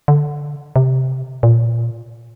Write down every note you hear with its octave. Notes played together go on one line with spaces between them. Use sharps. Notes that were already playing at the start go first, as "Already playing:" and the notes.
D3
C3
A#2